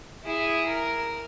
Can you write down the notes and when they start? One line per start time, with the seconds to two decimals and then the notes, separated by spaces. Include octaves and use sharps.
0.24 E4 G#4
0.67 A#4